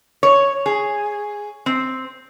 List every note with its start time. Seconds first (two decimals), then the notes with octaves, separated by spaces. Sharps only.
0.23 C#5
0.66 G#4
1.66 C4